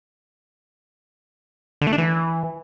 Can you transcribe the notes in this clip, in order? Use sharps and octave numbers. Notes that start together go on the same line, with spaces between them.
D3
A3
D4
E3